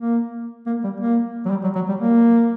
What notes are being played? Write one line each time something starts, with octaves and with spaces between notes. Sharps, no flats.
A#3
A#3
G3
A#3
F#3
G3
F#3
F#3
G3
A#3